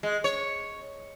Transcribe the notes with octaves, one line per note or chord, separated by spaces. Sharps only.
G#3
C#5